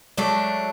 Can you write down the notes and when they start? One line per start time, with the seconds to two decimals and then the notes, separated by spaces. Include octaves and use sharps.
0.17 F#3 G#3 A3 D4